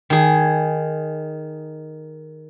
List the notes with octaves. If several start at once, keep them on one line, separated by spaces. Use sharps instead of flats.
D#3 G#4